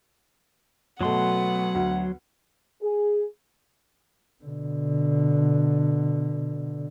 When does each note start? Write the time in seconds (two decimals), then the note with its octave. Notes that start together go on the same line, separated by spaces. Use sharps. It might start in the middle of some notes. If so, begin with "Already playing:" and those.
1.01 B2 F#3 A3 B3 F#5 C6
1.75 D2
2.82 G#4
4.44 B2 D3